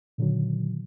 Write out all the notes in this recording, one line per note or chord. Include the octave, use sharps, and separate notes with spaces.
A#2 D3 D#3 F#3